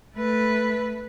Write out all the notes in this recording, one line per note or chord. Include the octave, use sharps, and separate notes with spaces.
A3 B4